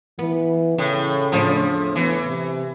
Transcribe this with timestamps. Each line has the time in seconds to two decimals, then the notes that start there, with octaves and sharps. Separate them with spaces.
0.19 E3 B3
0.78 A2 C#3
1.32 E2 A2 F3 D4
1.96 E3 B3
2.26 C3